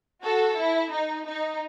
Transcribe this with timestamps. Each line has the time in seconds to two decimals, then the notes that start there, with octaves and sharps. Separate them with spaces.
0.23 F#4 A4
0.57 E4
0.92 D#4
1.27 D#4